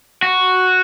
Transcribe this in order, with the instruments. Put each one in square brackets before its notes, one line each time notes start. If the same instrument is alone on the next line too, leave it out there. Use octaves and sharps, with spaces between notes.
[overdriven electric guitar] F#4